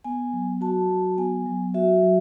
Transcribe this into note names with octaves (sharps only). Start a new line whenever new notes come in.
B3 G#5
F#3
F#4 A5
F#3
B3 G#5
F#3
F#4 E5
F#3